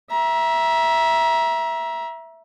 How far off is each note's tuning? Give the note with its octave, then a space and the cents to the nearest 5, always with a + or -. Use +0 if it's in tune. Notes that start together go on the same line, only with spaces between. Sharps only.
E5 +0 A#5 +30